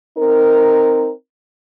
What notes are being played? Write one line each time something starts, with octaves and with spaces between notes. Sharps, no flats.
C4 D#4 A#4